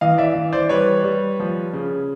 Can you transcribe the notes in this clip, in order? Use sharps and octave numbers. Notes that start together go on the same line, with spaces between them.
E3 D#5 F5
D5 E5
E3
C5 D5
G3 B4 C#5
G3
F3
C#3